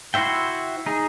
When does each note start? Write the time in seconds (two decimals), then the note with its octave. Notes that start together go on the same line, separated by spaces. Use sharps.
0.14 E4 F#4 C5 E5 G5
0.86 D#4 G#4